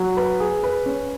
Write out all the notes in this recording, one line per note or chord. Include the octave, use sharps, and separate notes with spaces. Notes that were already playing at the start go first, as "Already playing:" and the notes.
Already playing: F#3
B4
G#4
B4
C#4